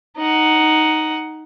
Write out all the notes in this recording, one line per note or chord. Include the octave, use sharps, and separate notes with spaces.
D#4 F#5